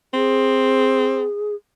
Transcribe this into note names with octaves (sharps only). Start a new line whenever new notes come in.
C4 G#4